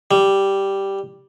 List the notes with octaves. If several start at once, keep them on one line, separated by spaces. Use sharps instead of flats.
G3